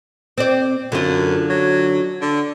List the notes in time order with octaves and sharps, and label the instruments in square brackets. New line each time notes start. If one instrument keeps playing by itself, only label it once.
[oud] C4 D5
[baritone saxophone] F#2 [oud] D3 F4
[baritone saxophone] F#3
D3